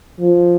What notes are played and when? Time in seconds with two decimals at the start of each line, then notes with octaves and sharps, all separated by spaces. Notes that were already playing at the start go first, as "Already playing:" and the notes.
0.20 F3